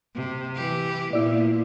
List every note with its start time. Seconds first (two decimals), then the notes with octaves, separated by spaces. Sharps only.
0.16 C3
0.56 E3 G4
1.13 A#2 B3 E4 D5